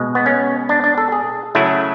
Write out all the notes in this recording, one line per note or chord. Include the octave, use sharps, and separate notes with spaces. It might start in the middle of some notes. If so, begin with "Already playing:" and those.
Already playing: B2 G#3
B3
C#4
D4
D4
A4
G#4
C#3 F#3 A3 E4